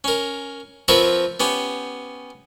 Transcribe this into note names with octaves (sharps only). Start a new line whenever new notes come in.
C#4 A#4
F3 C4 A#4 B4 C#5 E5
B3 C#4 G4